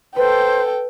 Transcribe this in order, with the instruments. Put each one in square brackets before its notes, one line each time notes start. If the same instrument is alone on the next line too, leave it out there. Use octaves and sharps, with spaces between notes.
[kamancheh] A4 G5 [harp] B4 [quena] C5